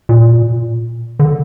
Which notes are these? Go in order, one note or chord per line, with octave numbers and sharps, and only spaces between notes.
A#2
D3